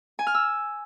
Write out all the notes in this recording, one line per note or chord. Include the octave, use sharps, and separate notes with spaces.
G#5
F6
E6